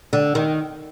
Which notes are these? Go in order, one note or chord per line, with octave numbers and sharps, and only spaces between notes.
D3
D#3